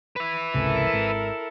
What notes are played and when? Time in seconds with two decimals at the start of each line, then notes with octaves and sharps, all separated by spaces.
0.16 B4 E5
0.54 G#1 C#2 C3 E4 A4 A#4
0.93 G#1